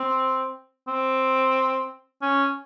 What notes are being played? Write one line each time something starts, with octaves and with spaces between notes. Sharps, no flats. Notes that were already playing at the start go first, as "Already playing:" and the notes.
Already playing: C4
C4
C#4